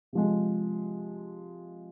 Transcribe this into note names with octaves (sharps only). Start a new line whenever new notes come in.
C3 F3 G#3